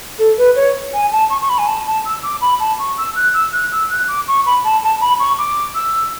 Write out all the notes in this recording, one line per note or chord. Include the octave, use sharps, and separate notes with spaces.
A4
B4
C#5
G#5
A5
C#6
C#6
B5
G#5
A5
A5
E6
D6
B5
A5
C#6
E6
F#6
E6
F#6
E6
F#6
D6
C#6
B5
A5
A5
B5
C#6
D6
E6